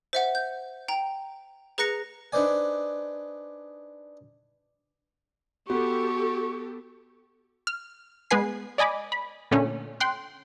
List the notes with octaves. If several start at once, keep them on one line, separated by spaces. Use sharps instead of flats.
C5 E5 F#5
G6
G5 A#5
G#4 B4 A#5 F#6 A#6 C#7
D4 D#4 B4 C5 D5 G#5
B3 F#4 G4 A4 C#6
F6
G#3 B3 B4 G#5 C7
D5 D#5 G#5 B5 D6
B5
A#2 D3 A3 C#4
G5 C6 F#6